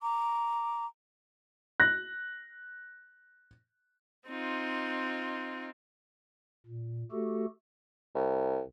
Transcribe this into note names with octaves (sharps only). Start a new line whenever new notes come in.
A#5 D6
F#6 A#6
C4 D#4 F4
A#2
A3 F#4 G4 A4
C2